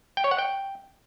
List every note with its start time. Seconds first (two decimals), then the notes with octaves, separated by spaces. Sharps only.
0.17 G5
0.24 C#5
0.31 F#5
0.38 G5